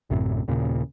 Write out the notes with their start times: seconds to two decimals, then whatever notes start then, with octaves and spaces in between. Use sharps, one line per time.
0.10 A1 F#2 A2 C3
0.48 D#2 A#2 C#3